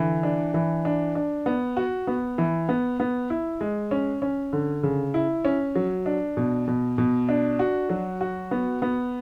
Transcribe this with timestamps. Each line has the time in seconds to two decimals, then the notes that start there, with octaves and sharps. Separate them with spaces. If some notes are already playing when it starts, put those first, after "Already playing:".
Already playing: D3 E3
0.23 D4
0.54 E3
0.85 D4
1.15 D4
1.46 B3
1.77 F#4
2.07 B3
2.38 E3
2.69 B3
3.00 B3
3.30 E4
3.61 G#3
3.91 C#4
4.22 C#4
4.53 D3
4.83 C#3
5.14 E4
5.45 C#4
5.75 F#3
6.06 D4
6.37 B2
6.68 B2
6.98 B2
7.29 D4
7.59 F#4
7.89 F#3
8.21 F#4
8.51 B3
8.82 B3